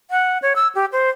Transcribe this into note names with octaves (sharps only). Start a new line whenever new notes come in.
F#5
C#5
E6
G4
C5